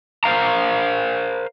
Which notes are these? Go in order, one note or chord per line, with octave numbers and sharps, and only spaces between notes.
A#4 C5 E5 F5 A#5